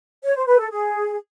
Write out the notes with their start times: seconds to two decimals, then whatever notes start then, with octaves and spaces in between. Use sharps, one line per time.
0.24 C#5
0.36 C5
0.47 B4
0.59 A4
0.71 G#4